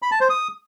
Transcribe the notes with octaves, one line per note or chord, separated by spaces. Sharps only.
B5
A5
C5
D#6